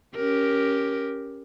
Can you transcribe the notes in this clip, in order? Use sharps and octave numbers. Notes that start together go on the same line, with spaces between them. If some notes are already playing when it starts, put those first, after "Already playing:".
C#4 G4 A#4